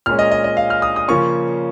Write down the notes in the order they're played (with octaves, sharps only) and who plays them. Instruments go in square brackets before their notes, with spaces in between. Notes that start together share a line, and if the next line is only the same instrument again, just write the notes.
[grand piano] A#2 G#3 C#4 F6
D#5
D#5
D#5
F5
F6
D#6
D#6
C#3 F3 A#3 C#4 C#6